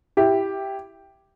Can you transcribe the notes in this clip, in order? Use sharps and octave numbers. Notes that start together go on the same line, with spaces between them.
E4 G4